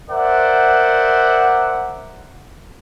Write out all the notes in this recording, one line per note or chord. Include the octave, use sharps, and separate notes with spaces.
A#4 C5 D5 E5 F#5